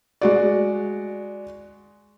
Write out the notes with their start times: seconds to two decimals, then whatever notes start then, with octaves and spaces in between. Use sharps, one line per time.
0.21 G#3 F#4 D5